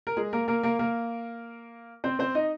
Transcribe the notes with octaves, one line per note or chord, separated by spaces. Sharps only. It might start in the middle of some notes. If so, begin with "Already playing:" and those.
A#4
G#3 G#4
A#3 A#4
A#3 A#4
A#3 A#4
A#3 A#4
C4 C5
C4 C5
D#4 D#5